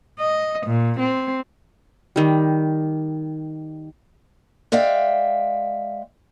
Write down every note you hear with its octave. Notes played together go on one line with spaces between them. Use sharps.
D#5
A#2
C4
D#3 G3
G#3 D5 E5 F5 G5